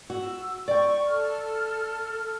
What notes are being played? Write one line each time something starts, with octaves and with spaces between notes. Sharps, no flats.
F#4 E6
D5 G5 C#6
A4 F6